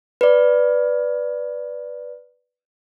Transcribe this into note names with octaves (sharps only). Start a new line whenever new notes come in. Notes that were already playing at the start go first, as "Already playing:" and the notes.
B4 D5